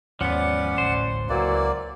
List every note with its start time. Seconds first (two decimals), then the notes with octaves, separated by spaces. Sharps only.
0.21 D#2 G#2 F3 G#3 B3 C#4 D5 F#5
0.78 D1 A1 C5
1.30 C#2 A#2 E3 F#3 A#3 D5